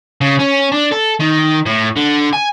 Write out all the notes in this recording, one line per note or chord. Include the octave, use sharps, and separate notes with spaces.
C#3
C#4
D4
A4
D#3
A2
D3
G#5